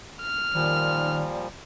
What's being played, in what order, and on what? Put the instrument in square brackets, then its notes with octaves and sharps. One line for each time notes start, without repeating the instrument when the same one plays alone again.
[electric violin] F6
[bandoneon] A#2 F3 G3 [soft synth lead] D#3